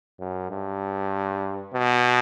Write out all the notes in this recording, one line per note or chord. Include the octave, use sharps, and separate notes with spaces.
F#2
G2
B2